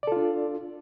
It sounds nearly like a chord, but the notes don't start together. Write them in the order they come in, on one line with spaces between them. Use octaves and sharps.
D5 A4 F4 D4